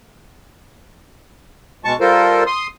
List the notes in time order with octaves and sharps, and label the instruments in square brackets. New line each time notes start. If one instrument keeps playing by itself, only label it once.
[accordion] B2 G#3 A5 C#6
G3 F4 A4 A#4 C5
C6 D#6